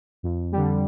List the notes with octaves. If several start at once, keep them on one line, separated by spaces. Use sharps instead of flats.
F2
D3 G3